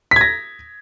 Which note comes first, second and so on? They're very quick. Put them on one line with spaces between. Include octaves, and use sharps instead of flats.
B6 G#6 A#6